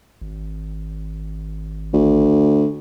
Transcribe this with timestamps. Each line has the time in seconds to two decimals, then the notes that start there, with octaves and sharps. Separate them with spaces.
0.21 G#1
1.93 D2